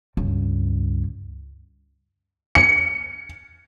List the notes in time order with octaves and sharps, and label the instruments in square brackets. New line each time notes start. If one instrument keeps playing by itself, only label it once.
[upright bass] C#2 G2
[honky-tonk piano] C#7